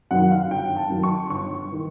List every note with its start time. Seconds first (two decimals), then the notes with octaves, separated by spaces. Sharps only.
0.11 F#2 D#3 F#5
0.31 F5
0.51 G1 G5
0.77 A5
0.90 F#2 D#3
1.03 C#6
1.30 G1 C#6
1.72 D#3